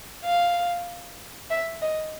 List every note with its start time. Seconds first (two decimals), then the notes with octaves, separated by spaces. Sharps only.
0.25 F5
1.50 E5
1.81 D#5